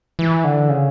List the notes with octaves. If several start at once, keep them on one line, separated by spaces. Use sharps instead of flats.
E3
D3
C#3